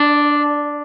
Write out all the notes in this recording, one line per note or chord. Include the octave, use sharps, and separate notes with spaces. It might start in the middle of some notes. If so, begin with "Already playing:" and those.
Already playing: D4